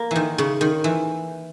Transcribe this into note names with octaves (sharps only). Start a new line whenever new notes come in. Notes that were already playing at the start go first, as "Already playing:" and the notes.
Already playing: A#3
D#3 E3
C#3
D#3
E3